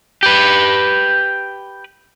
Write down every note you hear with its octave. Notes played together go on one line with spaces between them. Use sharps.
G4 B4